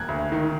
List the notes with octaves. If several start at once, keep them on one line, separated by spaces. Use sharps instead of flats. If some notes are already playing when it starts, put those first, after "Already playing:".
Already playing: E1 A#3 F#6 G#6
D2
D#3